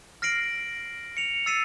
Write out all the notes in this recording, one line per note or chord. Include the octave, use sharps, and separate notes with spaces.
F6 A#6 C7 D7 F#7
C#7 F7
E6 A6 C7 D#7 E7